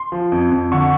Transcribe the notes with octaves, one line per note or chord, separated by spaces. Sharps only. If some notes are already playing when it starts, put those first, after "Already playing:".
Already playing: C6
F3
F2
F2
D3 C#6